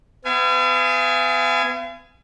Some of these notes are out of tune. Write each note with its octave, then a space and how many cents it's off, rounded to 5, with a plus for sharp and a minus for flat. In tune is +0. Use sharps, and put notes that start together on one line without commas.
B3 +40 F5 -45 G#5 +0